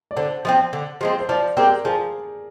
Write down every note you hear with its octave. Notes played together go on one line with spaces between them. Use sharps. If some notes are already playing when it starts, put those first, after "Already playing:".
D5
D3 C5
F3 G#3 C4
D3
F3 G#3 C4
C5
F3 D5
G#3 C4 G4 A#4
F3 G#4